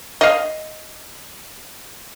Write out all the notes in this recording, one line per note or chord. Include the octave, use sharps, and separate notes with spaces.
D#5 F5